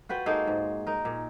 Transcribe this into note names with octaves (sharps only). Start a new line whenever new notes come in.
F4 F#4 B4 G5
G#3 A#3 D#4 A4
G#2
D#4 A#4
A#2